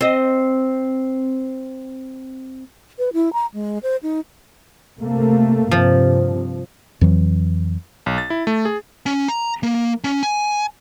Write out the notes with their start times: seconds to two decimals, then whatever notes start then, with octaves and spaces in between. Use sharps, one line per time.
0.01 C4 D#5
2.99 B4
3.13 E4
3.33 A#5
3.54 G#3
3.83 C5
4.03 D#4
5.00 C3 A3 A#3
5.71 G2 C3 F3
7.01 F2 E3 F#3
8.06 B1
8.18 A6
8.30 E4
8.47 A3
8.65 G#4
9.06 C#4
9.28 A#5
9.63 A#3
10.04 C#4
10.23 G#5